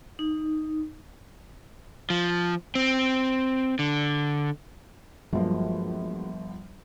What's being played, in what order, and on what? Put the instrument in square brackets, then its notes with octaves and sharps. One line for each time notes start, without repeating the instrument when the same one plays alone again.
[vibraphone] D#4
[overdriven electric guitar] F3
C4
D3
[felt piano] G1 F3 [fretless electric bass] F#3 G#3 A#3